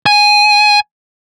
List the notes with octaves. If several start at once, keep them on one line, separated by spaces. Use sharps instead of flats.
G#5